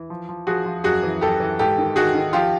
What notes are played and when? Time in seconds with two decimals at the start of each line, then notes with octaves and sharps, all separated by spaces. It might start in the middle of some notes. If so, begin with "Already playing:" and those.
Already playing: E3
0.10 F3
0.29 F3
0.47 F3 F#4 G#4
0.66 F3
0.84 F#2 F#4 G#4
1.03 E3
1.21 F#2 G4 A4
1.40 E3
1.59 G#2 G4 A4
1.78 D#3
1.96 D#3 F#4 G#4
2.15 D#3
2.33 F3 F4 G4